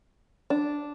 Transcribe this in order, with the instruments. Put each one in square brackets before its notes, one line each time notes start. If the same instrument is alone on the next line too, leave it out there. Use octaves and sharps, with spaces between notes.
[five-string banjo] D4